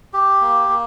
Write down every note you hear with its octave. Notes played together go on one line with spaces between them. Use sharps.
G4
A#3
A#3